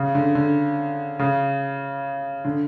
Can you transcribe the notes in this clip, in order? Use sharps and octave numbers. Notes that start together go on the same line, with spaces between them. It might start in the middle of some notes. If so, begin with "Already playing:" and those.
Already playing: C#3
D3
D3
C#3
D3